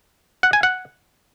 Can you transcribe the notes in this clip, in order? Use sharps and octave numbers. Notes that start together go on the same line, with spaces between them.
F#5
G#5
F#5